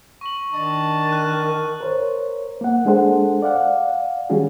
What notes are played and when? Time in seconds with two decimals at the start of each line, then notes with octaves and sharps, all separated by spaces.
0.21 C#6 F#7
0.52 D#3 D4 D#5 A5
1.09 A#4 F#6 D#7
1.81 A#4 C5 C#5
2.61 A#3 F#5
2.85 G#3 D4 G#4 A4 C5 F#5
3.42 D5 F5 F#5
4.30 D#3 G3 C#4 F#4 G#4